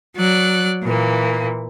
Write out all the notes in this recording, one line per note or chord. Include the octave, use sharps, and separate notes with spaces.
F#3 D5 F#6
A#2 E3 A#3